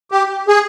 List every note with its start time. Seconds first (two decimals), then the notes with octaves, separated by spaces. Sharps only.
0.12 G4
0.48 G#4